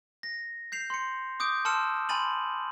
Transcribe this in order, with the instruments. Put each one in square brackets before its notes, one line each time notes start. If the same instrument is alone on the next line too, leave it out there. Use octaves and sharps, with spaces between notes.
[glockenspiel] A#6
G6 C7 F7
C6 C#7
D6 D#6 G6 D7
A5 C6 E6 F6 C#7 E7
G#5 B5 C6 A6 D#7 F#7